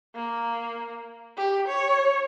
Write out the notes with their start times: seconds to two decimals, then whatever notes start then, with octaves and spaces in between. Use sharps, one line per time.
0.16 A#3
1.37 G4
1.68 C#5